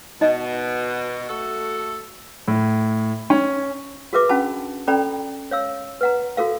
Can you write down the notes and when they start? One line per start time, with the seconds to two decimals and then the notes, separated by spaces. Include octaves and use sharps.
0.21 B2 D#4 D#5
1.29 A3 F#4 A4
2.48 A2
3.30 C#4
4.13 F#4 G#4 A#4 B4 E5 D6
4.29 C#4 D4 F#4 F#5 A5 B5
4.87 C#4 A4 D5 G5 A#5 B5
5.51 C#5 F5 E6
6.01 B4 F#5 A#5
6.37 F#4 A4 A#4 F5